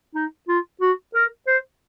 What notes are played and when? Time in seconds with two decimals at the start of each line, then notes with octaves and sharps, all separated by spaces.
0.15 D#4
0.48 F4
0.81 F#4
1.14 A#4
1.47 C5